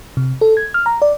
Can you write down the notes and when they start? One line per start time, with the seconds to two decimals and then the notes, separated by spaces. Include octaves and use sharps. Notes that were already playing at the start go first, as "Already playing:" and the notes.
0.17 C3
0.41 A4
0.57 G#6
0.74 F6
0.86 A#5
1.02 D5